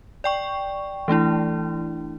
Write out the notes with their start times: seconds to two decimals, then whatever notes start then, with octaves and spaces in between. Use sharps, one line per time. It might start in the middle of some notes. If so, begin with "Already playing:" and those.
0.24 D5 G5 C#6
1.08 E3 A3 D4 E4